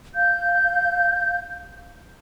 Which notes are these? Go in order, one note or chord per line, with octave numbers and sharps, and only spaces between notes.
F5 G6